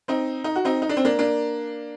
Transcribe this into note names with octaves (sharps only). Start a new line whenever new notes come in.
C4 D#4
D#4
F#4
C4 D#4
D#4
D4
C4
A#3 D4
A#3 D4